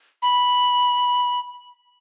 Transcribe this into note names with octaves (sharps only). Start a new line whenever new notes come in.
B5